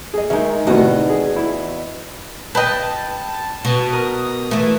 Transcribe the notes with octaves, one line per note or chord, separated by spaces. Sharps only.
G#4 D#5
D#3 G#3 D#4 E5
E2 A2 C3 D#3 F#4 D#5
G#4
E4
B4 D#5 G5 A5 B5 G6
B2
A#4 D#6
E3 A3 B4